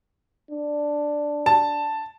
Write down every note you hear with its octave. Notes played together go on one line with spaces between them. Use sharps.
D4
A5